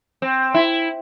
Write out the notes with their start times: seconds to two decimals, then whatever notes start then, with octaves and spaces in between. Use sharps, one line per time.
0.22 C4
0.54 E4